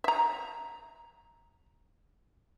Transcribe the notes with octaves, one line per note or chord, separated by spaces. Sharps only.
E5 A#5